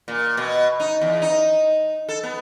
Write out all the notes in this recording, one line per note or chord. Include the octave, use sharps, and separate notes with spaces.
A#2
B2
D#4
E2
D#4
A4
B3